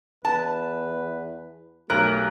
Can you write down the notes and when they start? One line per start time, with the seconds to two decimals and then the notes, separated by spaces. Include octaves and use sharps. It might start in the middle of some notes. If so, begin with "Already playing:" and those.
0.25 E2 B4 A5
1.90 B1 A3 G4 A#4 A#5 F#6